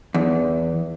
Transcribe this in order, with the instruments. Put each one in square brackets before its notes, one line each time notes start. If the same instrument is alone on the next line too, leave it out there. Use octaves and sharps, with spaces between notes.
[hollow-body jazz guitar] E2